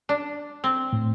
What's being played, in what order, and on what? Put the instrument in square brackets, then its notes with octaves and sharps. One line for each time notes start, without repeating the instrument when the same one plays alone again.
[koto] D4
C4
[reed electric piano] A2